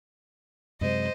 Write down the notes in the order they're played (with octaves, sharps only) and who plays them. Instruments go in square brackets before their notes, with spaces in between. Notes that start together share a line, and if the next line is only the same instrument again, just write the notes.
[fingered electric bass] F#2 C3 G#3 [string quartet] C5 D#5